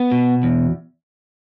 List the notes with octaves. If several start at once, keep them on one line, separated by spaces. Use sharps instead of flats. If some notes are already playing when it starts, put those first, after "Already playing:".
Already playing: B3
B2
E2